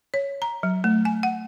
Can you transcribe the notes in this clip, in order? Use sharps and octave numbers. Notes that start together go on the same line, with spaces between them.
C#5
A#5
F#3
A3
G#5
F#5